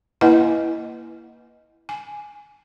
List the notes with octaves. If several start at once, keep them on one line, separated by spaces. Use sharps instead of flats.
A#3 E4 B4 D#5 F#5 G#5
G#5